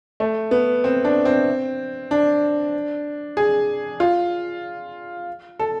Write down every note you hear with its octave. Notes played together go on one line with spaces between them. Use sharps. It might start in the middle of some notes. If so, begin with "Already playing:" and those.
A3
B3
C4
D4
C4
D4
G#4
F4
A4